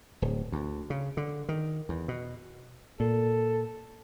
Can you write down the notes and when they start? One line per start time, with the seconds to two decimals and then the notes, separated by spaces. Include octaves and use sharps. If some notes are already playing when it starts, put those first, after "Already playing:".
0.22 D1
0.52 D2
0.90 C#3
1.17 D3
1.49 D#3
1.89 E2
2.08 B2
3.00 A#2 A4